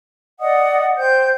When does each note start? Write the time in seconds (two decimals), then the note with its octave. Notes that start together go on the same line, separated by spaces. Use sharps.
0.40 D5 D#5 F#5 D#6
0.96 C5 G5 G6